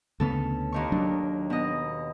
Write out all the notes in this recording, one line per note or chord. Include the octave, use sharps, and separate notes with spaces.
D2 C#3 B3 C#4 A4
D#2 D#3 C#6
F#3 D4
B2 D#5